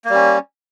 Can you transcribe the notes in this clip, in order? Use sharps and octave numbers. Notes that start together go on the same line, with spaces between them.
G3 A#3 C#4